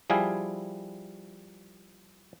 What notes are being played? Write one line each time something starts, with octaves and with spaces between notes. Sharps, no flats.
F3 G3 E4 G#4 F5 G#5